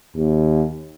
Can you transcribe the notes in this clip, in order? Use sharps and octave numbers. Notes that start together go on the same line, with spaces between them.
D#2